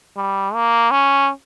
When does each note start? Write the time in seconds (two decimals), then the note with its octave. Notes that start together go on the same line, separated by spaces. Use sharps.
0.17 G3
0.54 A#3
0.91 C#4